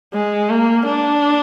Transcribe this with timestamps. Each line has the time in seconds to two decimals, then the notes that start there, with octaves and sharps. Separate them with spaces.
0.14 G#3
0.50 A#3
0.86 D4